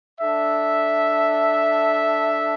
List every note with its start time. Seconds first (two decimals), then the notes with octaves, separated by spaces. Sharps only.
0.20 D4 A4 E5